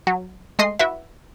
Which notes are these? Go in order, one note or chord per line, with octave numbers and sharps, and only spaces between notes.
F#3
G#3 A3 D#5 C6 C7
E4 F#4 B4 E5